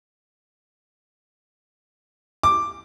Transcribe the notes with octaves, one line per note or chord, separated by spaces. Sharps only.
D6